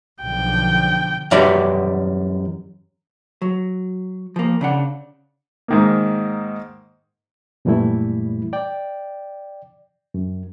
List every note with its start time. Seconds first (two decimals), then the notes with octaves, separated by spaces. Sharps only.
0.22 B1 D3 F3 G5
1.31 F#2 E3 G3 F#4 D5 G5
3.42 F#3
4.36 F3 A#3
4.61 C#3 D4 F#5
5.68 G#2 D#3 A#3
7.65 F#2 A#2 E3 G3 A3 E4
8.53 D5 G5
10.14 F#2